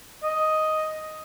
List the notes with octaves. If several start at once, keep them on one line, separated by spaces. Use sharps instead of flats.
D#5